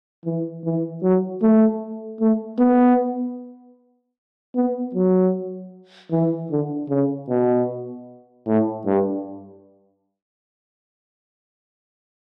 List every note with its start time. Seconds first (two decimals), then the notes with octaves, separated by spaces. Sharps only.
0.25 E3
0.64 E3
1.03 F#3
1.42 A3
2.21 A3
2.59 B3
4.55 B3
4.94 F#3
6.11 E3
6.51 D3
6.89 C#3
7.29 B2
8.47 A2
8.86 G2